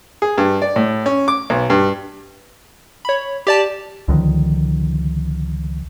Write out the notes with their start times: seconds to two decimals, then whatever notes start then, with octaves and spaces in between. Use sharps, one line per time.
0.22 G#4
0.38 G2
0.62 D5
0.76 A2
1.06 C#4
1.28 D6
1.50 B1
1.70 G2
3.05 C#5 B5
3.47 G4 D5 A5
4.08 C#2 D3 D#3 F3